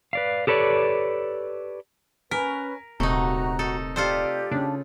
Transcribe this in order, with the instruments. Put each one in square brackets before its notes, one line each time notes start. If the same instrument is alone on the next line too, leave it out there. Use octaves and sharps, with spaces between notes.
[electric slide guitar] B4 D5 F5
G4 A4 B4 C#5 D5
[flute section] C#4 B4 [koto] A#4 [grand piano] G#5 B6
[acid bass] D#1 [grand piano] C3 [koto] A3 D#4 [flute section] F#4 A#5
[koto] D#4 A4
[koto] F4 A4 C5 [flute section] G4 D5
[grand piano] C#3 [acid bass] D4